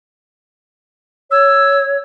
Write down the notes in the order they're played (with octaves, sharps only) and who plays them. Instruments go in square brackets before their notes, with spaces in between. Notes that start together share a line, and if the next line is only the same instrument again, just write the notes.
[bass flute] C#5 [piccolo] E6